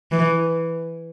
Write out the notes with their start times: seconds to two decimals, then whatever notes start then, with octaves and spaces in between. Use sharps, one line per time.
0.12 E3